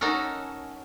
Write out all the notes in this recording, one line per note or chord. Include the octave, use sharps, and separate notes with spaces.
C#4 D#4 F#4 A4 A#4